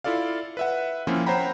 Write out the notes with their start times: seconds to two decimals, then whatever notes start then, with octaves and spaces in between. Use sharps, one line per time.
0.04 E4 F4 A4 D5 F5
0.57 B4 E5 F#5
1.07 F3 A#3 C4 C#4 E4 F4
1.26 C5 C#5 F#5 G5 A#5 B5